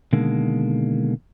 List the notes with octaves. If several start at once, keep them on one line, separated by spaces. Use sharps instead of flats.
B2 D3 D#3 G#3 A#3